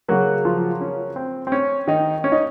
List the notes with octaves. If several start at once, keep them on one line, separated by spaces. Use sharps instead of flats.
C#3 F#3 A#3 F#4
F3 F4
C#4
C4
C4
C#4
D#3 D#4
C#4
D#4